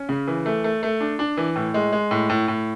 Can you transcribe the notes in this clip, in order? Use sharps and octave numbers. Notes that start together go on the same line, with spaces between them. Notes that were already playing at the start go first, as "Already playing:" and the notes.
Already playing: C#4
C#3
E3
A3
A3
A3
D4
D4
E3
A2
G#3
G#3
A2
A2
A2